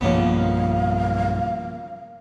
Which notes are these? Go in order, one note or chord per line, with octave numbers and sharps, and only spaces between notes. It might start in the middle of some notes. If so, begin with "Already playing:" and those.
B1 G2 C#3 F3 A#3 B3 F5